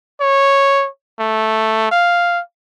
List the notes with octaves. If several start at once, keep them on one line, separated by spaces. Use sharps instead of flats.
C#5
A3
F5